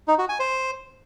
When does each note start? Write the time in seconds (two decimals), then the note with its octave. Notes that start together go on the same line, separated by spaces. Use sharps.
0.08 D#4
0.18 F#4
0.29 G#5
0.40 C5